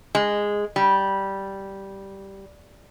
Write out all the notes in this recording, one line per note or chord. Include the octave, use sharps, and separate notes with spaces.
G#3
G3